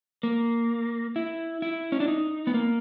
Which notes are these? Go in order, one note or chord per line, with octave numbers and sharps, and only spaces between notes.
A#3
E4
E4
C#4
D4
D#4
B3
A#3